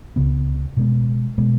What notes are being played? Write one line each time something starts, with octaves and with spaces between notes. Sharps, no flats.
C#2 C#3 B3
B2 G#3 B3
B2 G#3 B3